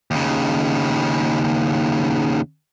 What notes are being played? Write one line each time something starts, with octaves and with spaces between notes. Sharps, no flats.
D#2 C#3